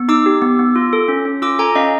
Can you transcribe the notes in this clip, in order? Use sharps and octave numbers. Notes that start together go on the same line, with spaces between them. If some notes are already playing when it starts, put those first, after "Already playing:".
Already playing: B3
D#4 D6 E6
G4
B3
B3
F4
A4
C#4
C#4
F4 D6 E6
A4 G#5 A#5
C#4 D#5 F5